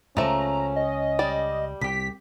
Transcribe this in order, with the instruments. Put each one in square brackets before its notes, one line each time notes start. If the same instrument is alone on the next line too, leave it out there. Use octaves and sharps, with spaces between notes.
[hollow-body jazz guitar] C#2 G2 [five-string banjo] F3 A3 [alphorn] C#4 [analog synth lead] A#5
[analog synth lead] D#5
[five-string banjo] G3 D5
[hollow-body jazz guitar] C2 G4 [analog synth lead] B6